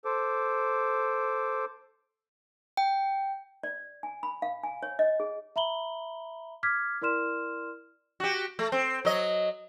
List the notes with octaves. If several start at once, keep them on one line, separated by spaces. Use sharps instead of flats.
A4 C5 D6
G5
D5
G#5
B5
F5
G#5
C#5
D#5
G#4
E5 A#5 B5 F#7 G7
D6 F6 G#6 B6
E4 A#4 D5 C6 F6 E7
F#4 G4
A3
C4
F#3 D#5